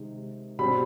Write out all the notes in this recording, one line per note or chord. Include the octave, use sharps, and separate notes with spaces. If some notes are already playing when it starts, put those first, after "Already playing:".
Already playing: C3 D#3 G#3
B2 G3 C4 B5